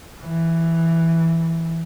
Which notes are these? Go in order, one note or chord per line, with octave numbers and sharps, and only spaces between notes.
E3